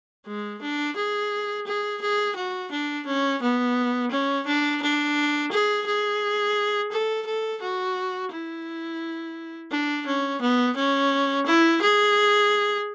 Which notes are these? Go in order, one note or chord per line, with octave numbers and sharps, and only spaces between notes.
G#3
D4
G#4
G#4
G#4
F#4
D4
C#4
B3
C#4
D4
D4
G#4
G#4
A4
A4
F#4
E4
D4
C#4
B3
C#4
E4
G#4